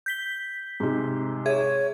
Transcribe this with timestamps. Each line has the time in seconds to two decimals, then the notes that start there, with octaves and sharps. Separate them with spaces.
0.06 G6 B6 G7
0.80 G#2 C3
1.46 G#4 C#5 E5 G#6